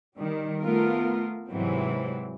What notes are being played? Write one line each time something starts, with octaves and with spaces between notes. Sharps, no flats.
D#3 G3
A3 B3 F4 A#4
G#2 C3 E3 F#3 C4